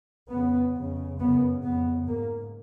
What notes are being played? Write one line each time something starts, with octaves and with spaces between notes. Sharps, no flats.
F2 C#3 B3
F2 C#3
F#2 C#3 B3
F2 C#3 B3
G#2 A#3